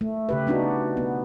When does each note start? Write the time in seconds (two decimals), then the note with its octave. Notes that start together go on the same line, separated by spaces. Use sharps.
0.01 A3
0.29 C#3 G4 B4
0.47 B3 D4 D#4 F#4
0.97 B3